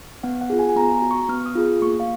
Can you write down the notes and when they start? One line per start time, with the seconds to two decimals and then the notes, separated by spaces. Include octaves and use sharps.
0.23 B3 F#5
0.41 F#5
0.50 F4 G#4
0.59 G#5
0.69 G#5
0.76 B3 A#5
0.94 A#5
1.02 F#4
1.11 C#6
1.29 B3 F6
1.46 D#6
1.55 F4 G#4
1.82 A#3 C#6
2.00 F5